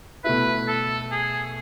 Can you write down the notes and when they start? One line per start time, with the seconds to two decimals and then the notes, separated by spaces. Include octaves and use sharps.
0.24 B2 A3 E4 B4
0.68 A4
1.11 G#4